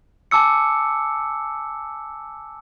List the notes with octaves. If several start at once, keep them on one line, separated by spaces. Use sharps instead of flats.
G#5 A5 D6 E6 C#7